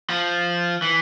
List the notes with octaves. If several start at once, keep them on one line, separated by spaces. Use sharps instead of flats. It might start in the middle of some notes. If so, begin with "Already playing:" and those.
F3
E3